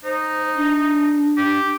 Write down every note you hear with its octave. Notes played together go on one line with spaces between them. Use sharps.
D#4 C5
D4
G4